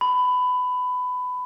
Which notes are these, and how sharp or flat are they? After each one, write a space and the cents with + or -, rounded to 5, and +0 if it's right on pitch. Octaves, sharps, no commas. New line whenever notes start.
B5 +20